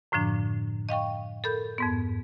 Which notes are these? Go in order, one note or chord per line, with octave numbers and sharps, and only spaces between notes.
F#2 A2 D3 F3 D4
D#5 F5 G5 C#6
A4 A#4 B5 G6
F2 G#2 B3